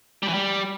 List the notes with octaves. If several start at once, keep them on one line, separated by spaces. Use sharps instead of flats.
G3
E3
G3